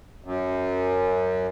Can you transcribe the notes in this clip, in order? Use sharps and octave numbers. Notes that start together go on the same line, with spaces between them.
F#2